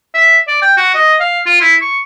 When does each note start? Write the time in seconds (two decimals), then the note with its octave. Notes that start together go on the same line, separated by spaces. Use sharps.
0.14 E5
0.48 D5
0.62 G5
0.77 F#4
0.94 D#5
1.20 F5
1.46 F4
1.61 E4
1.82 C#6